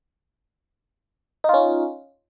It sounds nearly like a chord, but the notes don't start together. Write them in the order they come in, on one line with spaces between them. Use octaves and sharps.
D#4 F4 C#4